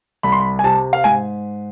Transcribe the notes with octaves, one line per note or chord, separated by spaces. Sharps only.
C2 B5
C6
B5
G#5
C3 A5
F5
G#2 G#5